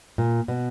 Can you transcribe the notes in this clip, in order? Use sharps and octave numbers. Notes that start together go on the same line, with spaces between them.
A#2
B2